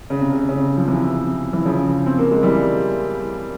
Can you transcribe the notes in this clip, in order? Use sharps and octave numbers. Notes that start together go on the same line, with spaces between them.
C#3
C3
C#3
C#3
F3
C3 E3
E3
C#3 F3
C4
A#3
G#3
E3 G3